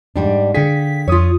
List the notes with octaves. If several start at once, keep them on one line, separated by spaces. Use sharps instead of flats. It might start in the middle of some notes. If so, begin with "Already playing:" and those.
G#2 G3 D4
D3 G#4 F5 G5 B6
F2 F4 C#5 D#6